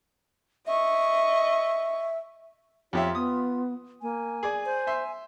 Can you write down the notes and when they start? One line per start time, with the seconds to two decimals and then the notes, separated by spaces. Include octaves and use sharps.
0.67 D#5 E5 C#6
2.93 F2 F4 G4 C#5 E5
3.15 B3 D#6
4.02 A#3 G#5
4.43 G#4 D5
4.66 C5
4.87 E5 C6